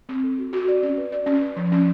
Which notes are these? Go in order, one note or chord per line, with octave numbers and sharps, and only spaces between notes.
C4
A4
F#4
F#4
D5
C#4
B4
D5
C#4
C#4
F3
C#4